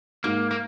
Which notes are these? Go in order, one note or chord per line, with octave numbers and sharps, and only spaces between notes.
G#2 A#3
A#3